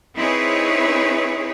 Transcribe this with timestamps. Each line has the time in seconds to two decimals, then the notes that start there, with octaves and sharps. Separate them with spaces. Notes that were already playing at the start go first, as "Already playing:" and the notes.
0.16 C4 D#4 E4 G#4 B4 C#5